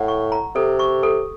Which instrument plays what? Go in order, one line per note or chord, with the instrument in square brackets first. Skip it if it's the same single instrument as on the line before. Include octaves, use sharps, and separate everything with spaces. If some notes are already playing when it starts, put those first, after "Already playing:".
Already playing: [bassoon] A2 [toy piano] F#5
[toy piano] C#6
A#5
[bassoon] C3 [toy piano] A4
[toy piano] C#6
A4